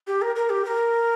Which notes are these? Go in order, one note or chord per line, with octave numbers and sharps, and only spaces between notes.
G4
A#4
A#4
G4
A#4